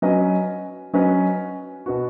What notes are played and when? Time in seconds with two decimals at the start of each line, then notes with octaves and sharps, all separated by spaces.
0.02 F#3 C#4 B4 D#5
0.93 F#3 C#4 B4 D#5
1.86 B2 B3 F#4